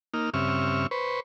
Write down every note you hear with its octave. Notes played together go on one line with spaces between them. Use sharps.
A#3 D#4 F6
G2 C#3 C4 E5 C#6 F6
B4 C5 C#6